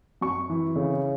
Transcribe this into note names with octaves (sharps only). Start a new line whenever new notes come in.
F#2 C#6
E3
C#3